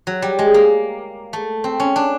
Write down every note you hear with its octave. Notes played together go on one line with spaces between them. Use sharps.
F#3
G3
G#3
A#3
A3
C4
C#4
D4